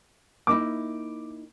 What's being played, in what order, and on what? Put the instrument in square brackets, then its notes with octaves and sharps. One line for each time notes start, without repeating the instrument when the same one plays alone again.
[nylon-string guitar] A#3 D#4 E4 [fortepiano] D6